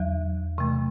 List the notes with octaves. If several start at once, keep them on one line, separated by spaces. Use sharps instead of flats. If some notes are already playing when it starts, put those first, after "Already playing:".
Already playing: E2 D3 F#3 E5
C3 E3 A3